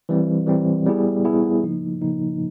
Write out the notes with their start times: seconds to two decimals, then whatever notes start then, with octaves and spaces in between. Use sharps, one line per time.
0.09 E3 G3 C4
0.47 E3 G3 C4
0.86 G3 B3 E4 G#4
1.24 G3 B3 E4 G#4
1.63 C#3 F3 A#3 D#4
2.01 C#3 F3 A#3 D#4